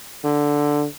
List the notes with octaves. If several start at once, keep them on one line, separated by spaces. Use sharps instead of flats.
D3